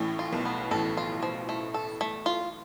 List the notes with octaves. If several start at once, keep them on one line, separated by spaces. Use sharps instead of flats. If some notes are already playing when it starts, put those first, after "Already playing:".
Already playing: A1 A2
F4
B1 B2
B3
A1 A2 A4
F4
F3
A3
A4
A3
F4